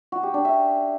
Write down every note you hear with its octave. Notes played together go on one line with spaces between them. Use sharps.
F#4
G4
D4
E5